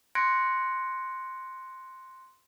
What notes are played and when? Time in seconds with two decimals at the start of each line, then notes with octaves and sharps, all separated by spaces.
0.15 C6 F#6 G#6 A#6 C#7 D7